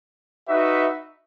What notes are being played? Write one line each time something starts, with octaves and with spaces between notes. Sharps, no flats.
D#4 F#4 B4 E5